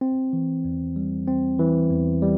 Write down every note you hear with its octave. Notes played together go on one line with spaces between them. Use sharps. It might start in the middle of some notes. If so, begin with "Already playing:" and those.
C4
E3
E2
G3
C4
E3
E2
G3